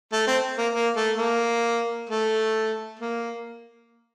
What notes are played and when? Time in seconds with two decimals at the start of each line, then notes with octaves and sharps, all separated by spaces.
0.13 A3
0.27 C4
0.58 A#3
0.74 A#3
0.96 A3
1.18 A#3
2.09 A3
2.99 A#3